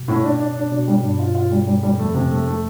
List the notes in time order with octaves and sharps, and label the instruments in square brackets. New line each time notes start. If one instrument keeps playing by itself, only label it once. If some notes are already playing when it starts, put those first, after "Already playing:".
Already playing: [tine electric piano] B2
[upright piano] A2
D4
D4
D4
[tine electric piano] B2 [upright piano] D4
[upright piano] G3
[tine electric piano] G2 [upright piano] D4
[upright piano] F4
F4
G3
G3
G3
[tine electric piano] F2 [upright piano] A3
[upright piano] C3
A3
A3